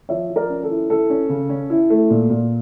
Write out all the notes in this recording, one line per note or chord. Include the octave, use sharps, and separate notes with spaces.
F3 C#5 E5
F3
A#4 D5
C#4
A4
E4
E4 A4
C#4
C#3
C#4
E4
A3
A#2
A#2